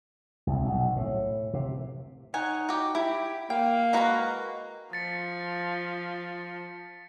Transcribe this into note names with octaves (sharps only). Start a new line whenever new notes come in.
C2
B1
A2
C3
D#4 C#5 F#5 G#5
F#4 G4
E4 G4
A#3 G5
G#3 F#4 B4 A#5 C#6
F3 A6 B6 C#7